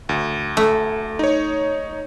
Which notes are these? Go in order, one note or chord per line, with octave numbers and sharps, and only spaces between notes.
D2
A3
D#4 C#5